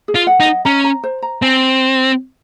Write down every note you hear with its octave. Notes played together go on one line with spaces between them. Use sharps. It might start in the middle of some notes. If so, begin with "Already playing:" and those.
G#4
F4
F#5
D#4
D#5
C#4 A#5
A#5
C5
A#5
C4 G#5